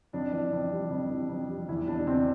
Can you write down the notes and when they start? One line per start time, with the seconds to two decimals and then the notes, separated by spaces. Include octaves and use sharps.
0.13 F2 D4
0.32 E3
0.52 F2
0.72 G3
0.90 F2
1.10 E3
1.29 F2
1.49 G3
1.68 E2 E4
1.87 B2 D4
2.06 E2 C4